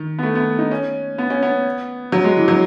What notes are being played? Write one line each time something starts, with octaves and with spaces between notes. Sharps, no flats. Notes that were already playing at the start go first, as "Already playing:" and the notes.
Already playing: D#3
B3
A3
B3
D#4
C#4
B3
C#4
B3
F#3
G#3
E3
F#3